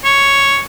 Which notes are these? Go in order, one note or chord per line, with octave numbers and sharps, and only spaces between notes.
C#5